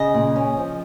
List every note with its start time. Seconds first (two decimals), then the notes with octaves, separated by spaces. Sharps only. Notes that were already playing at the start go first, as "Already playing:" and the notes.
Already playing: C#3 D#5
0.15 A#2
0.36 C#4
0.57 F3